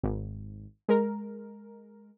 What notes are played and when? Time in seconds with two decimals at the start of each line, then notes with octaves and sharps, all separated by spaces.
0.03 G#1
0.88 G#3 A#4